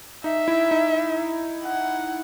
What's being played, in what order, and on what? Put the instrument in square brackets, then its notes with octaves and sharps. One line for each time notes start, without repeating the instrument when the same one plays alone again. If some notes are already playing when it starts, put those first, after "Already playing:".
[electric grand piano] D#4 [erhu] E5
[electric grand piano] E4
D#4
[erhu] F#5